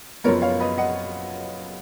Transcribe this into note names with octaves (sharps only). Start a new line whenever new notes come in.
F#1 F#2 F3 B3 A#4 C#5
C#5 F5
B4 D#5
D#5 F#5